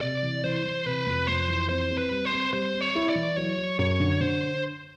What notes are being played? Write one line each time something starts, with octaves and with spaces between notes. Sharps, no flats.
C3 D5
E3
E3 C5
E3
C3 B4
F2
F2 C5
E3
C4 C5
C4
B4
G3
C5
C4
G3 C5
C4
C#5
E4
D5
E3
F#3 C#5
F#3
F#2 C#5
D3
D3 C5